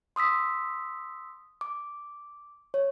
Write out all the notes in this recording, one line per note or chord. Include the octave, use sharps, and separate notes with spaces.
C6 D#6 E6 B6
D6
C#5